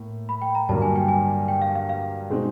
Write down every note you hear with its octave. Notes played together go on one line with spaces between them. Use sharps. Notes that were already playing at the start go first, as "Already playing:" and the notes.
Already playing: A2 A#3
B5
G5
A#5
G2 D3 F#3 A#3 A5
G#5
G5
G#5
G5
F5
F5
F5
B2 G#3 C4 D#4